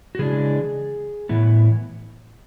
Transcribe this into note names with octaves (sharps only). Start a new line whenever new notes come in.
F#4
C#3 E3 G#3 D4 G#4
A2 E3 B3 E4